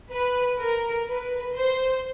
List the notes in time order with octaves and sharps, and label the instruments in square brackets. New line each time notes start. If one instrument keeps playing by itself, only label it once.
[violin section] B4
A#4
B4
C5